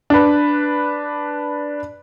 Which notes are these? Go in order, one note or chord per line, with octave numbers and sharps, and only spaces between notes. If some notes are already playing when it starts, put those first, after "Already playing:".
D4 B4